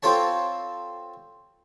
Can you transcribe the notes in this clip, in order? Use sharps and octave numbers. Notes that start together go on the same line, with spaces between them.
C4 F4 A4 C#5 A5